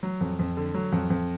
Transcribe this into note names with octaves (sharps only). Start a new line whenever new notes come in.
F#3
F2
F2
D3
F#3
F2
F2